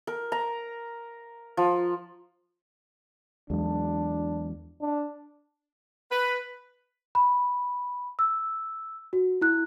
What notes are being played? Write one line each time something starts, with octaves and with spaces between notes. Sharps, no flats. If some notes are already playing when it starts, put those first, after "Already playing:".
A#4
A#5
F3
E2 F#3 G#3 D4
D4
B4
B5
E6
F#4
E4 F#6